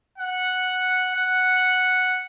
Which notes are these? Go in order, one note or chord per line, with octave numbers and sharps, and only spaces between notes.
F#5
F#5